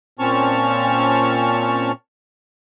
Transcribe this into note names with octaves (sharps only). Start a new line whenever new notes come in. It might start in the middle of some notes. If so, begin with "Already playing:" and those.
A#2 C4 C#4 A5 C#6 F6